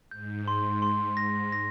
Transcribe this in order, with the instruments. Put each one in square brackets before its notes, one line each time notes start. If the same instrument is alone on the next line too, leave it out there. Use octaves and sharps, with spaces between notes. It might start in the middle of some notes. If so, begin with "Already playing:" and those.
[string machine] G#2 [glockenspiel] G6
[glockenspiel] C6
C6
[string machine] G#2 [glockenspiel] A#6
[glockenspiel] A#6